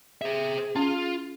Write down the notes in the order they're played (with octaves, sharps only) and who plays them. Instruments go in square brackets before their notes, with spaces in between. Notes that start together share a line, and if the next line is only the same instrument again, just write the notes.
[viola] G#4 [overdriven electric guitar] C5 E5
[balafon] C#4 [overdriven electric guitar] F4